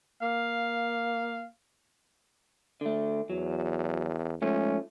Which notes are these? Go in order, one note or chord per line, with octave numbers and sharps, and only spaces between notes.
A#3 F5
D3 A3
E2 F#3
G#2 F3 A3 C#4